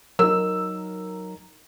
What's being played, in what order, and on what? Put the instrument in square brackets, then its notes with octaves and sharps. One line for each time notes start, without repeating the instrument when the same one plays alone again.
[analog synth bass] F#3 [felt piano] D#4 A#4 [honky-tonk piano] E6